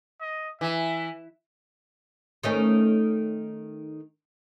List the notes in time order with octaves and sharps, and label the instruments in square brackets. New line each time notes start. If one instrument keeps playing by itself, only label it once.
[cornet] D#5
[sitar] E3 [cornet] E5
[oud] D#3 A3 C#4